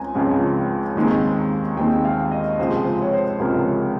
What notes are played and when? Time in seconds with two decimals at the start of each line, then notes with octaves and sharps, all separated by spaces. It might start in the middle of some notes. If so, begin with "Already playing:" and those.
Already playing: C#2 C#3 G#3 C4 G#5 A#5
0.15 C#2 C#3 F3 G#3 C4
0.96 D#2 D#3 G#3 C4
1.77 D#2 D#3 G#3 C4 G5
2.05 F5
2.31 D#5
2.59 C#2 C3 F3 G#3 C5
2.85 C5
3.02 C#5
3.13 C5
3.39 C#2 C3 F3 G#3 A#4